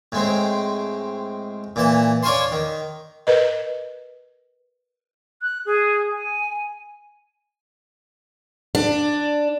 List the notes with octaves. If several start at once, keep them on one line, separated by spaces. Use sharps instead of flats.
A2 G#3 C4
A#2 E3 A5
D4 C#5 F5 G#5 A5 C6
D#3
A#4 B4 D#5
F#6
G#4
G#5
D4